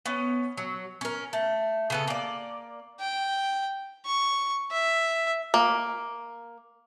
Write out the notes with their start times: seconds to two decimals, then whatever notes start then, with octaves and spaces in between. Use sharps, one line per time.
0.06 B3 C#4
0.57 F#3
1.01 C#4 A#4
1.33 A3
1.90 C#3 B3 A4
2.07 A#3 D5
3.00 G5
4.05 C#6
4.71 E5
5.54 A#3